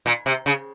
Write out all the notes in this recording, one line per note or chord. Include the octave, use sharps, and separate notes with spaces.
A#2
C3
C#3